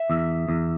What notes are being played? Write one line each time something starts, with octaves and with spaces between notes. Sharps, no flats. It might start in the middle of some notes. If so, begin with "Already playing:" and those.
Already playing: E5
E2
E2